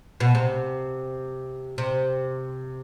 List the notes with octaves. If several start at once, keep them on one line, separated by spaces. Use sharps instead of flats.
B2
C3
C3